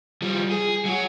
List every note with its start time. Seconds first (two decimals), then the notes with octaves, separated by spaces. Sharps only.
0.22 F3 G3
0.51 G#4
0.85 F#3 F#4